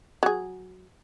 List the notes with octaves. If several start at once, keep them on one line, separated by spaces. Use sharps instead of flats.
F#3 G#4